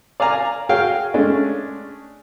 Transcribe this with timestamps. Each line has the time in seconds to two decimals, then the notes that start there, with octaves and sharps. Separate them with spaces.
0.20 D5 F5 G#5 A#5
0.69 F#4 G#4 C#5 F5 G5
1.14 G#3 A3 C#4 D4